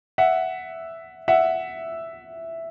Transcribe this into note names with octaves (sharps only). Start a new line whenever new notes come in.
E5 F#5
E5 F#5